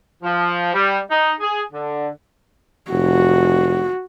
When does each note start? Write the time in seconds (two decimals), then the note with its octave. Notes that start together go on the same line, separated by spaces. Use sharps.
0.23 F3
0.74 G3
1.11 D#4
1.40 G#4
1.72 D3
2.91 F1 F#4